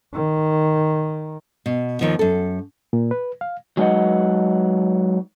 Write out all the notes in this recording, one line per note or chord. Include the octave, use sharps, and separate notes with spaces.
D#3
B2
D#2 D#3 F3
F#2 A4
A#2
B4
F5
F#3 G#3 D#4 B4 D#5 F#5